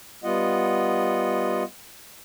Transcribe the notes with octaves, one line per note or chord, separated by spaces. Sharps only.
G3 B3 F4 D#5 F#5